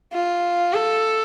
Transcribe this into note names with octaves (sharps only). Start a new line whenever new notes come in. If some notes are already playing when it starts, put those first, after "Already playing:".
F4
A4